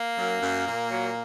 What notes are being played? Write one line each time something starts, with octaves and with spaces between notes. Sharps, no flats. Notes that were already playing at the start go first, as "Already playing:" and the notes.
Already playing: A#3
F#2
F#2
A#2
F#3